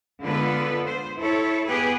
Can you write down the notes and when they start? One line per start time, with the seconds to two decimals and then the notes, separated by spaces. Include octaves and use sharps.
0.22 D3 G#3 B3 F4 A4 B4
0.85 C5
1.18 E4 A4 C#5
1.66 B3 G4 G#4 B4